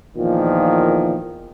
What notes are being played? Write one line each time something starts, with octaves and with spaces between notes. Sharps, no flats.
E2 A#2 D#3 F3